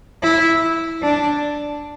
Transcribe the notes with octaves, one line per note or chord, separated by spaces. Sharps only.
E4
D4